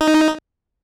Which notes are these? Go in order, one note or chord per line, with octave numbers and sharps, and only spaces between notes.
D#4